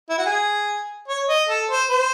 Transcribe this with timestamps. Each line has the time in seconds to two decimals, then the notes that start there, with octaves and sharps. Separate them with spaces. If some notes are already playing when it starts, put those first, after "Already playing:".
0.10 E4
0.18 F#4
0.26 G#4
1.08 C#5
1.29 D#5
1.49 A4
1.70 C5
1.91 C5